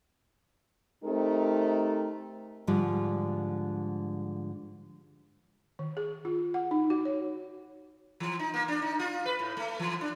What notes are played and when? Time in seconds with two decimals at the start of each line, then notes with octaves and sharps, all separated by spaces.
1.04 A3 C4 D#4 G4 A#4
2.67 G#2 D3 F3 G3 F4
5.79 D#3
5.97 G#4
6.25 F4
6.54 F#5
6.71 D#4
6.90 F#4
7.05 C#5
8.20 E3
8.39 D#4
8.54 A#3
8.68 D4
8.82 D#4
8.99 F4
9.25 B4
9.39 A2
9.57 A3
9.79 E3
10.01 D4